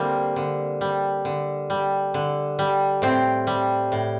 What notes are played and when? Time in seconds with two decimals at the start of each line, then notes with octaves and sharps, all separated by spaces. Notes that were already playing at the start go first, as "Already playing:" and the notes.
Already playing: D3 G3 A#3 C4
0.36 D3
0.81 G3
1.25 D3
1.70 G3
2.14 D3
2.59 G3
3.02 A2 C4
3.47 G3
3.92 A2